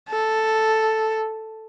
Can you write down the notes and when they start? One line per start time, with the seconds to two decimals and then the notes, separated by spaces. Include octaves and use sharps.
0.09 A4